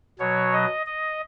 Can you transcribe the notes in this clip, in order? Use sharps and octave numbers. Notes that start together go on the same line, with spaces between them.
B2 F#3 C#5
D#5
D#5